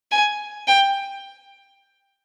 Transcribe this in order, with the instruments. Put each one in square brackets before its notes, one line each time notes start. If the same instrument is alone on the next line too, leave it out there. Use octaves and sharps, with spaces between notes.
[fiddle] G#5
G5